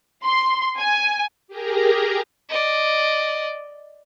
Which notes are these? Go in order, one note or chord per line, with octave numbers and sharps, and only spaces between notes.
C6
G#5
G4 G#4 A#4 A#5
D5 D#5